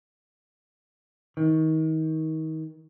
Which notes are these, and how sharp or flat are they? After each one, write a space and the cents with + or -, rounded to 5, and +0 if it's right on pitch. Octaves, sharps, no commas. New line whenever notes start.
D#3 +30